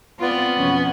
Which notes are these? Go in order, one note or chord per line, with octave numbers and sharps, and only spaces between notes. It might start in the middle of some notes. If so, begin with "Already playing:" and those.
B3 C4 F4 D5
F2 B2 C#4